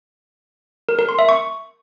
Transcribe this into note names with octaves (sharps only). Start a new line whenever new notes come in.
A#4
A#4
C6
E5
C#6